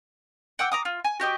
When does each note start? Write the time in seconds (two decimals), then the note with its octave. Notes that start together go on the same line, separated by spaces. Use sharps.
0.59 F#5 G5 D6 E6
0.72 A#5 D6 D#6
0.85 F4
1.04 G#5
1.20 F#4 G4 D#5 D6